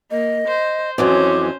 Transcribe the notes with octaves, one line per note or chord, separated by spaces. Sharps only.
A#3 D#5
C5
F2 E3 F#3 C#4 C5 D6